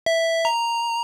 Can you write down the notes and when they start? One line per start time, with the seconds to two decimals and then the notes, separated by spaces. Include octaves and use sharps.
0.06 E5
0.45 A#5